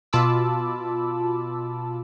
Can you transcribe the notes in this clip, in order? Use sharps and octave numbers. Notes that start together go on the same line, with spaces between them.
B2 F4 A5 B5 D6 E6